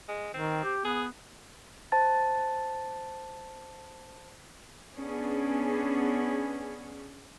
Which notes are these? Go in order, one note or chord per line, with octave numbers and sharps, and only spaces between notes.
G#3
D#3 C4
G4
B3 G#4
C5 A5 A6
B3 C#4 D4 G#4